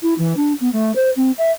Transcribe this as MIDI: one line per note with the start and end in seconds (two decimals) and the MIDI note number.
0.03 0.14 64
0.18 0.34 52
0.37 0.53 62
0.61 0.71 59
0.73 0.95 57
0.96 1.10 72
1.16 1.31 60
1.38 1.52 76